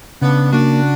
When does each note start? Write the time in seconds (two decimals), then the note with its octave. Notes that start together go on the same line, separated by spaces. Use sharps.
0.21 C#3 B3 D4
0.53 A#3 D4 F#4